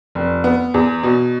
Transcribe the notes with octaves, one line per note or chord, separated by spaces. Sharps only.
F1
B3
E2
B2